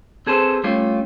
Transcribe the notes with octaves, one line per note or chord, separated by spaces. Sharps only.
C4 G#4 A4 B4 C5
G3 A3 C#4 F4